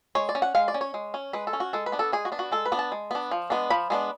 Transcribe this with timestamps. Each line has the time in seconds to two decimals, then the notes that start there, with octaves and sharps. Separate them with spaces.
0.15 G#3 C#5
0.29 D5
0.35 C#4
0.42 F#5
0.55 G#3 F5
0.68 D5
0.74 C#4
0.81 C#5
0.94 G#3
1.14 C#4
1.33 G#3 B4
1.47 A4
1.53 C#4
1.60 F#4
1.73 G#3 A4
1.86 B4
1.92 B3 D4
1.99 A4
2.12 G#3 G#4
2.25 F#4
2.32 B3 D4
2.39 F#4
2.52 G#3 A4
2.65 B4
2.72 B3 D4
2.79 A5
2.92 G#3
3.11 B3 D4
3.31 F3
3.50 G#3 B3 D4
3.70 F3 B5
3.90 G#3 B3 D4